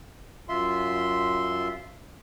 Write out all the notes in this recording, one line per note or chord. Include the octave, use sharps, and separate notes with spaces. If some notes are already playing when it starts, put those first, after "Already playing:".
F#2 F4 E5 C6